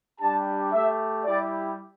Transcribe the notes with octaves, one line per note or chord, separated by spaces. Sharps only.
G3 D4 G4 A5
A3 G4 E5
G3 E4 G4 D5